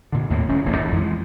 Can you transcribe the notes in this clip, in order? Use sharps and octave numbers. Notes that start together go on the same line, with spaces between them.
A#2 D3
D#2 A2 D#3 A#3
D#1 E2 G#2 C#4
D1 A1 A#3
D#2
F2 E3 G#3